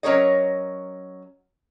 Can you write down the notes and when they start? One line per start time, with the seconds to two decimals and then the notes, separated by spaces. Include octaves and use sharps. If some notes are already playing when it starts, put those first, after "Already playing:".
0.03 F#3 C#4 A#4 C#5 D#5